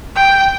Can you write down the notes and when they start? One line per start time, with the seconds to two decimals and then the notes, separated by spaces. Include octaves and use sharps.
0.16 G5